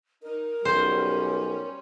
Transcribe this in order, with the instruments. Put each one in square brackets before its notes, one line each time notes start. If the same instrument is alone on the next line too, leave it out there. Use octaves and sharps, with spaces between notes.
[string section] D#4 [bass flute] A#4
[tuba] B1 [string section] G3 C#4 [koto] C5